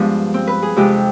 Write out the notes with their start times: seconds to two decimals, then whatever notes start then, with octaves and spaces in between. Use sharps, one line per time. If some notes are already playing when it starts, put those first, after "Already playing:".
Already playing: G2 F3 G#3 B3 D4
0.34 C4
0.47 B4
0.63 G#4
0.76 F2 C3 F3 G#3 G4